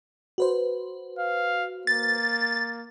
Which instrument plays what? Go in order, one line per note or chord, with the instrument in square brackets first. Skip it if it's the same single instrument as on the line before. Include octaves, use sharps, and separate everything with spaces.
[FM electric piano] F#4 B4 C5
[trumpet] F5
[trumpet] A#3 [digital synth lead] A6